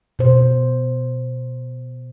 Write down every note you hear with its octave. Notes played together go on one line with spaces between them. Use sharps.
B2 C5